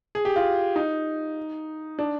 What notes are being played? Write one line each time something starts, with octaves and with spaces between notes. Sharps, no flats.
G#4
G4
F4
D#4
D4